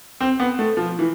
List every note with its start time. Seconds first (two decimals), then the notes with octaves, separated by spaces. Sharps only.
0.20 C4
0.40 B3
0.59 A3
0.77 F3
0.99 E3